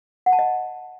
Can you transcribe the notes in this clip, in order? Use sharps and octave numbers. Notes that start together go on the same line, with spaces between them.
F#5
A5
D#5